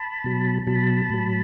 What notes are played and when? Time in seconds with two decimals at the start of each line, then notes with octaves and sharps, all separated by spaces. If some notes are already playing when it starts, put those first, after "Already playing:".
Already playing: A5 B5
0.24 B2 F#3
0.67 B2 F#3 A5 B5
1.10 A2 F#3